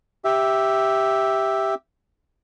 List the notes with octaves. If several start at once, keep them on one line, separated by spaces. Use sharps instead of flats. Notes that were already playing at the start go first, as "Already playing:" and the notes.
G4 E5